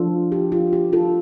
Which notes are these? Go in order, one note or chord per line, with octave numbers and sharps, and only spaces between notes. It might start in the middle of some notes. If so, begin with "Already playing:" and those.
Already playing: F3 D4 F4 A4
G4
F4
G4
F4 A4